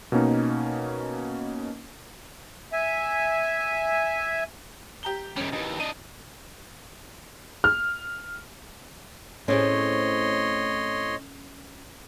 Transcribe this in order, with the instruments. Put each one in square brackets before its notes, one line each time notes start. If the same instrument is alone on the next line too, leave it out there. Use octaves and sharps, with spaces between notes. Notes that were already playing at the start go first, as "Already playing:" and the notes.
[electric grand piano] B2 A#3 C#4 D#4
[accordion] E5 G#5
[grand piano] G4 A#5 G7
[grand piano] F#1 C#4 [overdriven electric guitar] D#3 G3
[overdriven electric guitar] D#2 E3 [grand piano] D#4
[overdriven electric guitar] D4 D#5 [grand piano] D#7
[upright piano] F6
[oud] A2 C4 G#4 [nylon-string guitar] C#4 [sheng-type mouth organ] C#5 D#5 C6